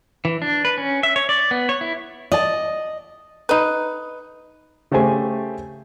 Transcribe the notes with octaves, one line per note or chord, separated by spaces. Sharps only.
E3
D4
B4
C#4
E5
C#5
D5
B3
C#5
E4
D5 D#5 A5
D#4 B4
C#3 A3 G4 C5 G#5